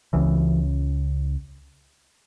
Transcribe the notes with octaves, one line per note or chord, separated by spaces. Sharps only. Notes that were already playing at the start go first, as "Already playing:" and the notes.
C#2 C#3 E3